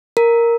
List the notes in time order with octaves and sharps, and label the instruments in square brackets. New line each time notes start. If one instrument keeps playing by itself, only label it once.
[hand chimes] A#4